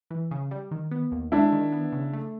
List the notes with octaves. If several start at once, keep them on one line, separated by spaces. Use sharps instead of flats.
E3
C#3
G3
D#3
B3
D#2
G#3 D4 E4
D#3
B3
C#3
A3